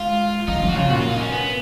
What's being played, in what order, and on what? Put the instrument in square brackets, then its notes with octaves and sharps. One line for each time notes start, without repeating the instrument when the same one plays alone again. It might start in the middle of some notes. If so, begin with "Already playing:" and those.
Already playing: [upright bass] G#3 [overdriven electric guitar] F4
[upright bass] F3 [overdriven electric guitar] D#4
[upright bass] F3 [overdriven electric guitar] F4
[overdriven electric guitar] F#4
[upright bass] C#3 [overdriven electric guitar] F4
[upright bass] A#2 [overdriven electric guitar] F#4
[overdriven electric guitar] F4
D#4
C#4
B3